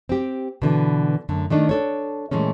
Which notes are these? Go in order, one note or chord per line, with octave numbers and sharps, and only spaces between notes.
C4 G4
B2 D3 E3
F#2 D3 A3
D#3 A3 D4 D#4
D4 A4 C#5
A#2 E3 G#3 A3 C#4